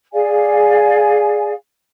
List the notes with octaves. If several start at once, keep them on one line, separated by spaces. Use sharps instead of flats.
G#4 D5 F5 G#5